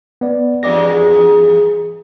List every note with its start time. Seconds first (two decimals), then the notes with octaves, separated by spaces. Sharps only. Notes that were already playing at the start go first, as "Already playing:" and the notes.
0.21 B3 D5
0.63 E2 G2 G#3 D5 D6 A#6
0.91 G#4